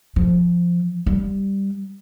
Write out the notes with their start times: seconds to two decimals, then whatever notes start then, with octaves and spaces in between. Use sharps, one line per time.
0.16 F3
1.06 G3